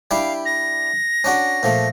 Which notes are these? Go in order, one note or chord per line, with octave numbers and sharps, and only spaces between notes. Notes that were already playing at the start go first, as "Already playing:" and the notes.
G3 D4 E4 F5
A#6
C#4 D4 F#4
A#2 F3 A3